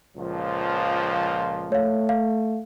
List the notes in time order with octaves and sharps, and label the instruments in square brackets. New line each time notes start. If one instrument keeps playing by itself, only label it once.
[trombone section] C#2 A#2 F3
[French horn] A3 [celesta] C#5 F5
[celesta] F5